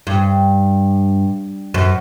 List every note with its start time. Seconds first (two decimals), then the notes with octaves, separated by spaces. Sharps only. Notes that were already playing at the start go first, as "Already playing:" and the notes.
0.07 G2
1.74 F#2